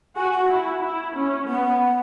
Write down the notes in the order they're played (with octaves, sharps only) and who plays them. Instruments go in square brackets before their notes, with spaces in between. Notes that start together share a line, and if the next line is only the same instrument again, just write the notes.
[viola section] F#4 [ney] G#5
[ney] F#5
[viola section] E4
E4
C#4
[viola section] B3 [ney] F#5